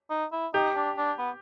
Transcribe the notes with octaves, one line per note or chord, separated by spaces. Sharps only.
D#4
E4
D#4 G4
D4
D4
B3